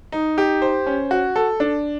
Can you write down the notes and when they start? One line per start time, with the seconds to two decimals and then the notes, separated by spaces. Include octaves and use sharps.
0.12 D#4
0.38 G4
0.62 C5
0.87 C#4
1.11 F#4
1.36 A4
1.60 D4